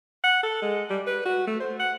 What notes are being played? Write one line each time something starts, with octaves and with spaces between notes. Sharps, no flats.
F#5
A4
G#3
G3
B4
F#4
A3
C5
F#5